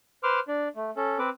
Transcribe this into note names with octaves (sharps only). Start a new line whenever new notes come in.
B4 C5 C6 D6 F6
D4
A3
C#4 A4
C4 B4 D6